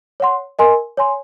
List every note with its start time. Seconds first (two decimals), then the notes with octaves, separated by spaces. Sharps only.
0.20 C#5 F#5 C6
0.59 A#4 D#5 G#5 C6
0.97 C#5 G#5 C6